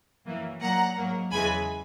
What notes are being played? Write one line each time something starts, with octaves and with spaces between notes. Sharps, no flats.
F#2 E3 A#3
A#2 F#3 A#3 F#5 A#5
G#2 F#3 A#3
E2 C#3 E3 G#3 G#5 B5